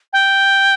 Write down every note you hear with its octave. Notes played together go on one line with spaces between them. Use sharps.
G5